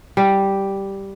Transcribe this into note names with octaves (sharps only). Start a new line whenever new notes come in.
G3